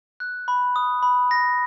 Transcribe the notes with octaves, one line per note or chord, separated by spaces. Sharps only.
F#6
B5
D#6
B5
A#6